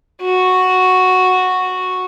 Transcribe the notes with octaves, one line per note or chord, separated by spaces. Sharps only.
F#4